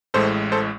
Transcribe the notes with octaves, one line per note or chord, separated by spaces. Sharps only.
A1 A2 G#3 A4 C5
A4 C5